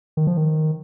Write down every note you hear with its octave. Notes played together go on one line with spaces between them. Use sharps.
D#3
F3
D#3